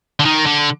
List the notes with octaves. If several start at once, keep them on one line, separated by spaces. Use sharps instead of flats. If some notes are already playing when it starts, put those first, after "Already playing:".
D3
D#3
D3